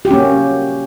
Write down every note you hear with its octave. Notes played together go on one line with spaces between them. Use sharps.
A#3 C#4 F#4 G4